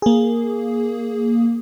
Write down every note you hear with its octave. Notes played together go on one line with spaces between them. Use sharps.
A#3 G#4